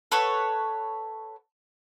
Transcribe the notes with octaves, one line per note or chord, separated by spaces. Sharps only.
A4 B4 C#5 F#5